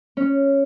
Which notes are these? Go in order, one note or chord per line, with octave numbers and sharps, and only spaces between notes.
C#4